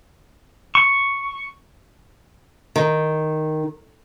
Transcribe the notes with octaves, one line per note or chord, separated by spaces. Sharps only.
C#6
D#3